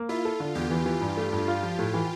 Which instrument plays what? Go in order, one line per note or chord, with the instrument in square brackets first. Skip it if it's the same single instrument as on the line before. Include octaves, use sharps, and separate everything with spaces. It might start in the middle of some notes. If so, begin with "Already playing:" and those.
Already playing: [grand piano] A#3
[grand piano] E4 [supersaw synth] F4
[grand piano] A4
D3
[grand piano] E2 [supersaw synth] G4
[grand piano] E3
E3
G2
A3
G2
F4
F3
A2
E3